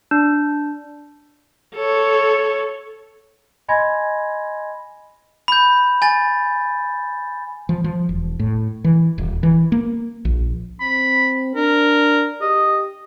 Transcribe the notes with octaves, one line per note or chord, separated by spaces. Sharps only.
D4
A4 C#5
D#5 G#5 B5 C6 G#6 A#6
B5 G6
G#5 A6
F3
F3
E1
A2
E3
D#1
E3
A#3
A#1
C4 B5
D4 A#4
G4 D#5